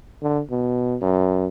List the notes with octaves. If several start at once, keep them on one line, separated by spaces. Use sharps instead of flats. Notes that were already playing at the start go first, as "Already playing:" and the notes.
D3
B2
F#2